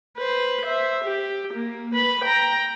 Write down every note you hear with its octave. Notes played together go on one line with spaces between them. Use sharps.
B4 C5
C5 E5
G4
A#3
B4 B5
G5 A#5